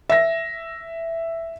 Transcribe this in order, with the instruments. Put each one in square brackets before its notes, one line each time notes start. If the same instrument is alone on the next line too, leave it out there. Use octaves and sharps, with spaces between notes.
[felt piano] E5 A#6